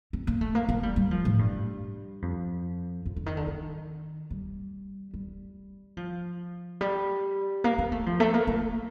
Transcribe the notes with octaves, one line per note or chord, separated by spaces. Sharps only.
C4
A#3
A3
A#3
A#3
G3
G3
F3
A2
G2
F2
F2
D3
D#3
D3
D#3
G3
G3
F3
G3
A#3
A#3
A3
F3
A3
A#3
A#3